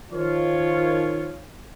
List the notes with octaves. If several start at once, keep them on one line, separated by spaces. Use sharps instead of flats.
D#3 F3 F4 C#5